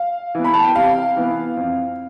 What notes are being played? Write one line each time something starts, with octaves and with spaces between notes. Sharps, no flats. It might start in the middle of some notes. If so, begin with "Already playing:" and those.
Already playing: F5
E3 B3
B5
A5
G5
C3 F5
E3 B3
F2